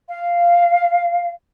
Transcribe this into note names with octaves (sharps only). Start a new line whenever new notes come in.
F5